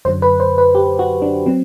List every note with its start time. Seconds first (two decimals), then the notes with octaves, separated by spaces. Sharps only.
0.05 F#2 D3 F#3 C5
0.22 B4
0.40 C5
0.58 B4
0.75 G4
0.99 F#4
1.22 D4
1.46 F#3 C4